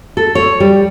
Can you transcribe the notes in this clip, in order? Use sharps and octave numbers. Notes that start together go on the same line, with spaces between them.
A4
C#5
G3